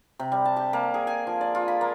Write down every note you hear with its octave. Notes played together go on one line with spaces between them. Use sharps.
C3
G3
A5
G4
A#3
G#4
G#5
F3
D5
F4
B5
A#3